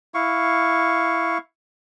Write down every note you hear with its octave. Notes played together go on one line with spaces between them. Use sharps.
E4 F5 C#6